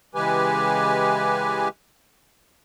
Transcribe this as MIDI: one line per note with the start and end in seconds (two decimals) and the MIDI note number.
0.15 1.68 49
0.15 1.68 52
0.15 1.68 56
0.15 1.68 67
0.15 1.68 71
0.15 1.68 80